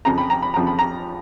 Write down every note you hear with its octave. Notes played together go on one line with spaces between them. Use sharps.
F2 C#3 F3 A#5
B5
A#5
B5
F2 C#3 F3 A#5
B5
A#5